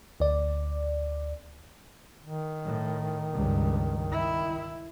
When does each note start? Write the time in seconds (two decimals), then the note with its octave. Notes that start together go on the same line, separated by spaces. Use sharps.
0.20 D2 D5
2.23 D#3
2.65 A2
3.33 C#2 G2
4.12 E4